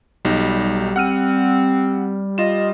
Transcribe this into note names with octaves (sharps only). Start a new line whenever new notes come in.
B1 G3 D#4
C4 F#5 F6 D#7
F4 D#5 E7